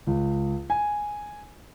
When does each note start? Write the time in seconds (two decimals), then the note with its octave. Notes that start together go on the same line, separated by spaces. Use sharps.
0.07 C#2
0.70 G#5